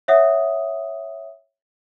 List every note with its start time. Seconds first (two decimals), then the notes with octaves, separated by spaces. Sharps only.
0.08 C#5 E5 F#5 D#6